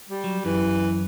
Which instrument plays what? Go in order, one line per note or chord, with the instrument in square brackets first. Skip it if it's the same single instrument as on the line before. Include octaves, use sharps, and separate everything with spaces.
[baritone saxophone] G3
[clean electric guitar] F#3
[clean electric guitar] F#2 [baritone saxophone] E3